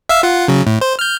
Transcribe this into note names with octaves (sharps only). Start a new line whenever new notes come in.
E5 F5 E6
F4 F#5
C#3 F#3
A2
C5
F6 G6